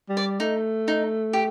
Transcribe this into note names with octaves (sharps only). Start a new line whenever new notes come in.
G3
D5
A3 D#4
D#4
G4